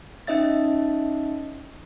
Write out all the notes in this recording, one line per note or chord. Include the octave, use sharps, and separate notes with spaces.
C#4 D#4 D#5 E5 A6